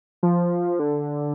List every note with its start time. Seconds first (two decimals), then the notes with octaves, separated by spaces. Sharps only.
0.23 F3
0.79 D3